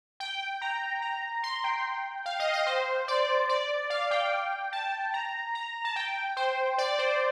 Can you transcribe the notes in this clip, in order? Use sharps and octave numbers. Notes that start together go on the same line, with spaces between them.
G5
A#5
A#5
C6
G5
F5
D#5
D#5
C5
D5
D5
F5
G5
A5
A#5
A#5
A5
G5
C5
D5
C5